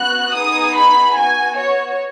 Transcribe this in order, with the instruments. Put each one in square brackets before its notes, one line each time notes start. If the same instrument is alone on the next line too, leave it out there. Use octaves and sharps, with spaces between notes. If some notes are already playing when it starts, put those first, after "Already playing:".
Already playing: [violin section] B3 F#4 F#6
B3 D#4 G#4 D#6
B5
B3 F#4 G#5
C#5